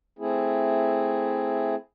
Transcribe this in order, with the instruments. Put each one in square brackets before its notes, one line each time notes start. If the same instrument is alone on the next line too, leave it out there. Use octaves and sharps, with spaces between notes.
[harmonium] A3 C4 E4 G#4